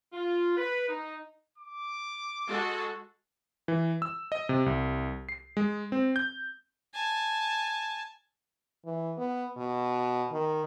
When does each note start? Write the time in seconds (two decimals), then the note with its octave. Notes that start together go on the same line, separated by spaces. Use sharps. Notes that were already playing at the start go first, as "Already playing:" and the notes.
0.13 F4
0.57 B4
0.89 D#4
1.58 D6
2.49 G#3 F#4 A4
3.68 E3
4.02 E6
4.32 D#5
4.49 C3
4.66 C2
5.29 C7
5.57 G#3
5.92 C4
6.16 G6
6.94 G#5 A5
8.85 E3
9.18 B3
9.56 B2
10.32 D#3